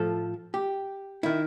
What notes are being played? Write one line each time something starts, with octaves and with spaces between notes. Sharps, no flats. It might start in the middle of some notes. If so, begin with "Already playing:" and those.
Already playing: A2 F3 A4
G4
D#3 E4